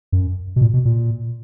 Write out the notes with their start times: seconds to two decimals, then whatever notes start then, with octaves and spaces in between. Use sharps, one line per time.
0.12 F#2
0.56 B2
0.61 A#2
0.74 B2
0.85 A#2